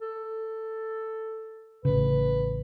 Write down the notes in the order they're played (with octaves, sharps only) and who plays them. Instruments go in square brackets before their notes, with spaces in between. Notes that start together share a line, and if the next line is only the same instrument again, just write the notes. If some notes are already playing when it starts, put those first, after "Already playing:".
[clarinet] A4
[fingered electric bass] A1 C#3 [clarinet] B4